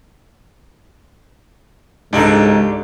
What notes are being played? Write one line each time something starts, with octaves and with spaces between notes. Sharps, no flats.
C#2 G#2 D4 D#4 G4 A4